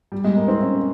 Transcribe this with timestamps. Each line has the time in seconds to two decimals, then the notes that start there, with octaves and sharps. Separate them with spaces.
0.12 G3
0.24 G#3
0.36 A#3
0.48 C4
0.60 C#4